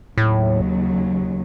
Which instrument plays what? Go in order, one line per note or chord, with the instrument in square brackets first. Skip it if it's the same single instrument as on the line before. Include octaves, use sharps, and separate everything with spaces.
[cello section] D#2 C#3 F#3 [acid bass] A2